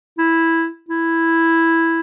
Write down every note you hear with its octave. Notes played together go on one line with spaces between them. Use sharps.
E4
E4